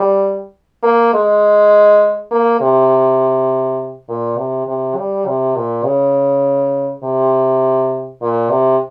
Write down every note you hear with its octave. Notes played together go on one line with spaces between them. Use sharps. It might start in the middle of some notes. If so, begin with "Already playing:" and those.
Already playing: G3
A#3
G#3
A#3
C3
A#2
C3
C3
G3
C3
A#2
C#3
C3
A#2
C3